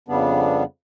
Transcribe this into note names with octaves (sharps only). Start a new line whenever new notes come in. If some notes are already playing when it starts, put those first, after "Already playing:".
F2 C#3 G3 B3 D4